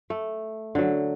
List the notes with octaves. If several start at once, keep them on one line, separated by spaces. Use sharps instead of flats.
A3
D3 F#3